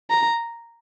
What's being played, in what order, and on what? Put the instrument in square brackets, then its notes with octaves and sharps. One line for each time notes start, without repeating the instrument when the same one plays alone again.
[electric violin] A#5